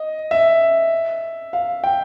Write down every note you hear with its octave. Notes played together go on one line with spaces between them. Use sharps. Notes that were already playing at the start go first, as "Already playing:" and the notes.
Already playing: D#5
E5
F5
G5